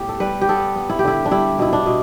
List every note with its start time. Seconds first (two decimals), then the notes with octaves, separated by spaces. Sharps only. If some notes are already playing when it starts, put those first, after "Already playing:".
Already playing: A2 B3 G4
0.09 A4
0.20 G3 B4
0.41 G4
0.48 B3 A4
0.76 B3
0.89 E4
0.99 G4
1.04 D3 E4
1.25 D4
1.31 G3 E4
1.59 B2 E4
1.73 D4
1.86 B2